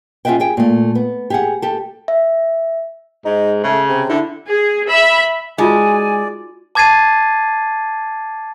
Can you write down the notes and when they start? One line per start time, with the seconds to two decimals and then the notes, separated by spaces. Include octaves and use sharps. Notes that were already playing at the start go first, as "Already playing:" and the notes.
0.25 C#4 F4 G#4 E5 F#5 G5
0.40 G4 G#4 G5
0.57 A#2 A3
0.95 B3
1.30 G4 G#4 F#5
1.62 G4 A4
2.08 E5
3.25 G#2 D#4
3.64 C#3 A3
3.89 C3
4.10 D3 E4
4.48 G#4
4.88 E5 B5
5.58 G#3 D#4 F4 F#4 D5 G#5
6.75 A5 D6 G#6 A6 C7 D#7